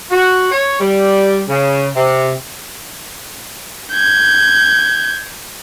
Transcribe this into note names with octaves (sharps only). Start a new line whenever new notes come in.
F#4
C#5
G3
C#3
C3
G6 G#6